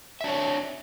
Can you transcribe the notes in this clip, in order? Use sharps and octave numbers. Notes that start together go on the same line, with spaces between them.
D4 C#5 E5